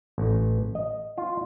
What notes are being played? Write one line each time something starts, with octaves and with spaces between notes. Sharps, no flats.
A1
D#5
F4